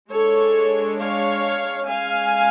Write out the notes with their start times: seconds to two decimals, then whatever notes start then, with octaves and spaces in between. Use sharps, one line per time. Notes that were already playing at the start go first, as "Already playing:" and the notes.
0.11 G#3 D4 A4 C#5
0.99 C#5 F5
1.88 G#3 C#4 F5 G#5